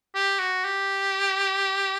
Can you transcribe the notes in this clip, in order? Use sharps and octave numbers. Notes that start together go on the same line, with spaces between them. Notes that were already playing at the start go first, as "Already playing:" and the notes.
G4
F#4
G4